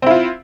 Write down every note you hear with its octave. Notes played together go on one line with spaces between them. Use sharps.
C4 E4 F4